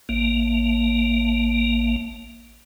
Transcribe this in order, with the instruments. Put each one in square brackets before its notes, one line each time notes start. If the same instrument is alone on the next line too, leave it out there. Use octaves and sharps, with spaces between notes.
[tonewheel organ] A1 A#3